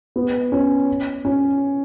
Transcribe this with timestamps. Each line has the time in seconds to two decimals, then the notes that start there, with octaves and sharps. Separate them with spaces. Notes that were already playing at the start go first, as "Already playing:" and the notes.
0.16 B3
0.52 C#4
1.25 C#4